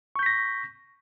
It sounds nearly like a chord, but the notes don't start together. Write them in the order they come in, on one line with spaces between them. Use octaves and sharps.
C#6 G6 B6 A#6